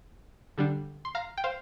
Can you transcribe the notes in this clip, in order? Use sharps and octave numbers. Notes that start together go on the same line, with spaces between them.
D3 G3 D4
C6
F5 A#5
G5
C5 F5